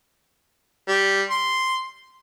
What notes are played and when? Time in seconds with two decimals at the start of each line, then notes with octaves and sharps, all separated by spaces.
0.88 G3
1.30 C6